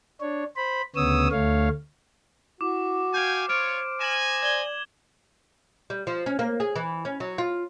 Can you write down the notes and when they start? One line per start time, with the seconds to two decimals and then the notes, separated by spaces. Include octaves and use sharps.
0.21 D4 C#5
0.56 C5 B5
0.96 D2 C#3 B3 C#5 D#6 E6
1.31 D2 A3 C#5 F5
2.61 E4 F#4 D6
3.14 F5 G5 G#5 G6 G#6
3.49 F4 C5 C#5 F6 D7
4.00 D#5 G#5 E7 F#7
4.43 D5 G#6 G7
5.90 G3
6.07 F3
6.26 C#4
6.39 A#3
6.60 G#4
6.76 E3
7.05 C#4
7.20 F#3
7.38 F4